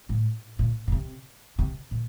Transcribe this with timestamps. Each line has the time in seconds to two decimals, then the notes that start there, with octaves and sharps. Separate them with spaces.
0.09 A2
0.59 A#2
0.88 A#2
0.92 C3
1.59 C3
1.91 A#2